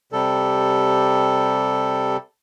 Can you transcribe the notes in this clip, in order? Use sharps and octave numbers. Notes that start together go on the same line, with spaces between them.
C3 G3 A4